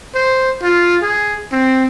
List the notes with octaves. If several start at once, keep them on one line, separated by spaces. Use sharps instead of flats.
C5
F4
G#4
C4